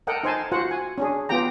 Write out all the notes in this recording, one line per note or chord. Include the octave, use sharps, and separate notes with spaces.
A4 A#4 D#5 F#5 G5
D#4 C5 G#5 A5
F4 F#4 C5 F#5
G#5
C#4 D4 G#4
B3 F4 G4 G5 A#5